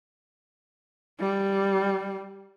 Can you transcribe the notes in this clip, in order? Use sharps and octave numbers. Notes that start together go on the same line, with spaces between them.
G3